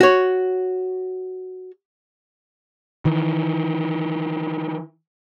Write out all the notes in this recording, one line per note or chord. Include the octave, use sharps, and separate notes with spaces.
F#4 C#5
D#3 E3